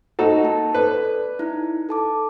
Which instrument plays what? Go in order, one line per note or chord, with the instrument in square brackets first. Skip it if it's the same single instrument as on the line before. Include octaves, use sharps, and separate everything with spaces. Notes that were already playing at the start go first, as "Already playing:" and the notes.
[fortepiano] D#4 F#4 A4
[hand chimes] A#3 A5
[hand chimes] A4 D5 [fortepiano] B4
[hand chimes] D#4 E4
A4 A5 D6